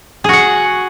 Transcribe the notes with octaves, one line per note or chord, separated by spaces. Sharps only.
F#4 G#4 F#5